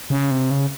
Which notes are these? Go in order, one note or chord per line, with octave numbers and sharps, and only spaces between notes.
C#3
C3
C#3